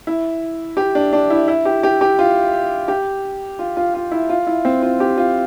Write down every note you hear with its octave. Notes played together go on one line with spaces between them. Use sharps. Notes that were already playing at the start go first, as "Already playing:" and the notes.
E4
G4
D4
D4
E4
E4
G4
G4
G4
F4
G4
F4
F4
F4
E4
F4
E4
C4
F4
G4
F4